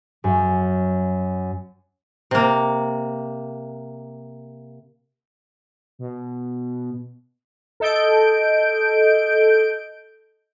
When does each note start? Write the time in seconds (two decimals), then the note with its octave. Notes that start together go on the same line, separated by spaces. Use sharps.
0.24 F#2
2.31 C3 A#3
5.99 B2
7.80 A4 D#5 G6 D7